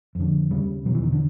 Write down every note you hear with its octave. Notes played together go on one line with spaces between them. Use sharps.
F2 D3
D#2 C#3 G3
E2 B2 F#3
E3
D#3
D3